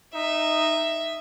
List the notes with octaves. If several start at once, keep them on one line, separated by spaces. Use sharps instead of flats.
D#4 E5